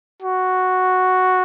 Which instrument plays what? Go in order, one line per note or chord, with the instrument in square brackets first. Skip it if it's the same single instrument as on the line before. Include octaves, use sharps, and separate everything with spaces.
[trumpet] F#4